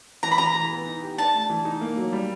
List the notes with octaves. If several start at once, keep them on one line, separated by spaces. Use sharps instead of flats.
E3 A#5
B5
E3 A#5
E3
B3
D#4
G4
D4 A5
A3
E3
D#4
A#3
F#3
G3